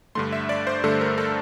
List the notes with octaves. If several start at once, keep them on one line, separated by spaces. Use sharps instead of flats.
G2 D3 A3 C6
E5
D5
C5
G2 D3 A3 A4
A#4
A4